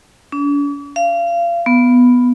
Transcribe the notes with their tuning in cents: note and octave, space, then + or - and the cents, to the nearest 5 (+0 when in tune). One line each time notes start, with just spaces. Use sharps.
D4 -45
F5 -30
B3 +0